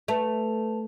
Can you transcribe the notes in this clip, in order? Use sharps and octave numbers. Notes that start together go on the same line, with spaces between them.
A3 B4 A5 F7